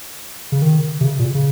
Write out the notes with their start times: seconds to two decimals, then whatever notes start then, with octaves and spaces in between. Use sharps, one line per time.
0.52 C#3
0.62 D#3
1.01 C3
1.05 C#3
1.19 A#2
1.35 C#3